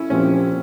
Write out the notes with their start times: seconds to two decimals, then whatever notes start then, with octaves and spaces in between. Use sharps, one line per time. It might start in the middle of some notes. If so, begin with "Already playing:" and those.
Already playing: C#4 E4
0.10 A#2 F3 C4 C#4 G4